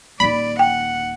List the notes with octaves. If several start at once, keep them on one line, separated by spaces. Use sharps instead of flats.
D#1 D#3 D5 B5
F#5 G5